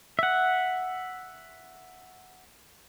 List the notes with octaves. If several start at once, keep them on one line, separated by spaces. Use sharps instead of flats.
E5 F#5